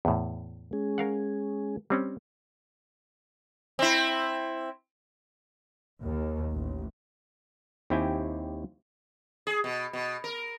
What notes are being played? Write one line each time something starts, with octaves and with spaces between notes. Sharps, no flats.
E2 A2
G#3 C#4 G#4
A#4 F5 F#5
G3 C4 C#4
C4 E4
D#2
A1
D#2 C4 E4 G4 G5 G#5
G#4
B2
B2
A#4